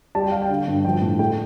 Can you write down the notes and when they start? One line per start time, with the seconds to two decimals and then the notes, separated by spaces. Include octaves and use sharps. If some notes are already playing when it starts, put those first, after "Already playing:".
0.15 G3 A5
0.23 G5
0.32 G3 F5
0.41 G5
0.50 D3
0.68 G2
0.85 F3 G5
1.02 A2
1.19 A3 G5